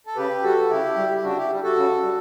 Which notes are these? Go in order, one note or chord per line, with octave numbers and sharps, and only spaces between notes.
A4
C#3 G4 B4
G3 F#4 A4
C#3 E4 G4
G3
G4
C#3 D4 F#4
E4 G4
G3
F#4 A4
C#3
G3